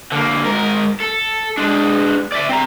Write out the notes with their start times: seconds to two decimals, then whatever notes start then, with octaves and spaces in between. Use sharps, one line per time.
0.12 D3 A#3
0.45 G#2 A#4
1.00 A4
1.57 G#3 D4
2.32 D5 E5
2.49 C4 A#5